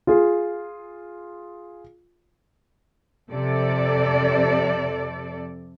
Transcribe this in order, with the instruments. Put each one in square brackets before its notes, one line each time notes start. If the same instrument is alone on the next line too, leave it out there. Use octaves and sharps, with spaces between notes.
[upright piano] F4 G#4
[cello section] F2 C3 A4 D5